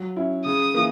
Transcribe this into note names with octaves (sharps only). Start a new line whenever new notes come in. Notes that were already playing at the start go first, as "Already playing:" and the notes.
Already playing: F#3
C#4 E4
C#3 D#6
E3 A#3